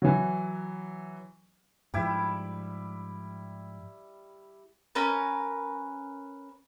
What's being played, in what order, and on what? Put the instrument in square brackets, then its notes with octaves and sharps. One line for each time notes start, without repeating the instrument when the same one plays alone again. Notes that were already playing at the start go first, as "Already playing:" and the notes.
[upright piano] E3 F#3
[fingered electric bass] G#2 F3 [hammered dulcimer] G3 E4
[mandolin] C#4 A#4 B4